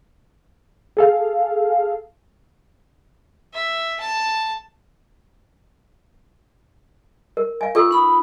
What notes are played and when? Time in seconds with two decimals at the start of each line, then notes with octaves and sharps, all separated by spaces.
0.97 G#4 A4 F5
3.54 E5
4.01 A5
7.37 A#4
7.61 F5 G#5
7.75 F4 A4 C#6 E6
7.91 D#4 B5 D#6